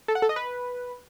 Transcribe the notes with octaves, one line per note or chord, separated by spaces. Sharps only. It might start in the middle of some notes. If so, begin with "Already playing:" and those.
A4
F#5
A4
D#5
B4